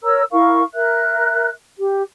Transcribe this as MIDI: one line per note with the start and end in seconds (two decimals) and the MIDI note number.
0.04 0.23 70
0.04 0.23 73
0.04 0.23 82
0.04 0.23 88
0.32 0.62 64
0.32 0.62 70
0.32 0.62 77
0.32 0.62 85
0.74 1.50 70
0.74 1.50 76
0.74 1.50 90
1.79 2.03 67